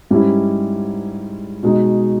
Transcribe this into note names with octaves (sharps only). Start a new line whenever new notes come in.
G#2 G3 C#4 E4
B2 G#3 D#4